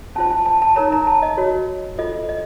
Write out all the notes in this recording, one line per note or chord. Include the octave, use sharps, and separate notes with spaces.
C#4 F4 C5 A5
A5
A5
A5
D#4 A#4 C#5 A#5
A#5
A5
D#5
F#4 A#4 C#5
F4 A4 C5 D#5
D#5